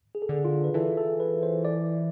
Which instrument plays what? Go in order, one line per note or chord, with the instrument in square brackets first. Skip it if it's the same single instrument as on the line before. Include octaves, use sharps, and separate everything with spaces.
[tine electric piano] G#4
A4
[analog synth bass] D3 [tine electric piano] G#4
[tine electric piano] F4
B4
[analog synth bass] E3 [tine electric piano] A4
[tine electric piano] A4
B4
C5
D5